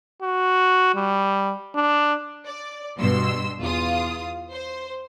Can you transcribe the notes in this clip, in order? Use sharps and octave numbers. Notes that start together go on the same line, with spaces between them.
F#4
G3
D4
D5
G2 B2 C6 E6
E2 F4 D#6
C5